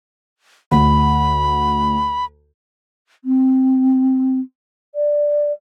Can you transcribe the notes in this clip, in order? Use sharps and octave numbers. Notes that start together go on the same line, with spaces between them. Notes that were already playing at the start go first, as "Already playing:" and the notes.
D2 B5
C4
D5